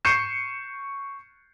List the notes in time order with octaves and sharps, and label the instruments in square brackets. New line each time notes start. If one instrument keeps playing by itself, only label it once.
[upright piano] C#6 G6 C7 C#7 D#7 E7